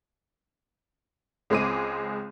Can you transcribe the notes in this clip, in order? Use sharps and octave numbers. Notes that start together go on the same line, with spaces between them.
C#2 G#3 C4 G#4 D6 D#7